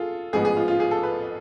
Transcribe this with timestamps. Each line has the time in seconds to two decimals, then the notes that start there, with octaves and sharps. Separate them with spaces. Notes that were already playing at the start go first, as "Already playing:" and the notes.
Already playing: F4 G#4 A4
0.33 A1 G#2 F3 B3 G#4
0.45 G#4
0.57 F4
0.68 F4
0.80 G#4
0.91 A4
1.03 B4